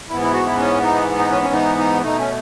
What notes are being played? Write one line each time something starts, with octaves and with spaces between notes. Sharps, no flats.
G#2 E3 B3 E4
E4
F#4
E4
C#4
D#4
D#4
C#4
C#4
D#4
D#4
B2 A3 D#4
C#4